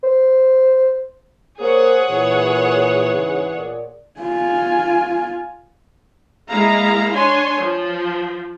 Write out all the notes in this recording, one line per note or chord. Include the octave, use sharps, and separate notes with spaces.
C5
A#3 G#4 C5 C#5 F#5
A#2 E3
G#2 C#3
A#2 D5
F4 G#5
G#3 A#3 E4 F5 A#5
D4 C#5 G#5 C6
F3